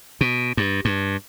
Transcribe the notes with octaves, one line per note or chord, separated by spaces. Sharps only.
B2
G2
G2